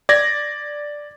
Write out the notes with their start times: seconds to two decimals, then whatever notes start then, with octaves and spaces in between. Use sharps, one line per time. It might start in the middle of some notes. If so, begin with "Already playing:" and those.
0.09 D5 G#6 A#6